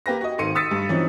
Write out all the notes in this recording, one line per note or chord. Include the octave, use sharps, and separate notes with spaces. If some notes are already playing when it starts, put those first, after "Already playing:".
A#3 G4 B4 A#6
F#4 D#5
G#1 D#3 A4 C6 C#7 D#7
D#6 E6 A6 B6 C#7
G2
E3 F3 C4 C#4 D#4